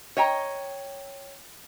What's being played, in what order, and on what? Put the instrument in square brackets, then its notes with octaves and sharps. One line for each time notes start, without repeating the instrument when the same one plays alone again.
[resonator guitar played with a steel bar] C#5 D#5 G5 A#5